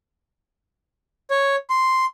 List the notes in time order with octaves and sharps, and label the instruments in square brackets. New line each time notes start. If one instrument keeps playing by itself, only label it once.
[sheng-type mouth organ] C#5
C6